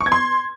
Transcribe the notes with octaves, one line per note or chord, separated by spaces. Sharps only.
C#6
G#6
C6